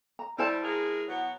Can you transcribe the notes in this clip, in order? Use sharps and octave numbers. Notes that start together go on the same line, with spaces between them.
A#5
G3 E4 C5 A5
G#3 G#4 A#4
B2 F#3 B3